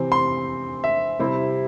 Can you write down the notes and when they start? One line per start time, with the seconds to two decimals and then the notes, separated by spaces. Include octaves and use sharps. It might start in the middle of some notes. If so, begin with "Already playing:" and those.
Already playing: C3 E3 C4
0.12 C6
0.84 E5
1.19 C3 G3 C4 E4